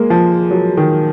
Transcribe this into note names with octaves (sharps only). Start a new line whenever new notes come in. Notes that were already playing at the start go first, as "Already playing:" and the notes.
Already playing: G#3 A#3
F3
F#3
D#3